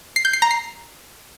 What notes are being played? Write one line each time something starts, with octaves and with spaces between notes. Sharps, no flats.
C7
G6
C7
A#5
C7